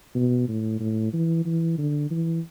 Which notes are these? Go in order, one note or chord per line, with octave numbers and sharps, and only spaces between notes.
B2
A2
A2
E3
E3
D3
E3